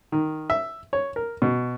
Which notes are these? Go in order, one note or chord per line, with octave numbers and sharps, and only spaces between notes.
D#3
E5
C#5
A#4
B2